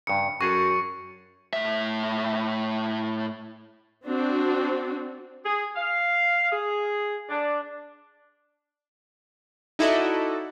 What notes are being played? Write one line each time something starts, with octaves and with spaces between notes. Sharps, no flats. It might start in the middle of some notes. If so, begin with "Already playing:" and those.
G2 C#3 C#7
F#2 F#4 G#4 A4 C#6
A2 E5
C4 D4 F#4
G#4
F5
G#4
D4
D#4 E4 F#4 A4 D5 D#5